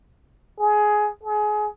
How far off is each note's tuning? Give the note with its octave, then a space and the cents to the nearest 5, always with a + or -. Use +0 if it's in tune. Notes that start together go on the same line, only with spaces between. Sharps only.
G#4 +15
G#4 +25